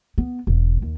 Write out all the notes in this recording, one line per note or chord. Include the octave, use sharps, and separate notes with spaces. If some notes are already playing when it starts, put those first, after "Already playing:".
B3
E1
D#2